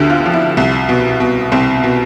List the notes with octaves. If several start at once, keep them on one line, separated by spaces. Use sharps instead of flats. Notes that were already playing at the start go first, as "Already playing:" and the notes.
Already playing: D2 D3 G4
F4
F3
E4
C2
B2
B2
C2 C4
B2